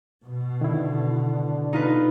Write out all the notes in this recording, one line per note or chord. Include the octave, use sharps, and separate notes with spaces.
B2
D3 D#3 E4
B2 D#4 F4 B4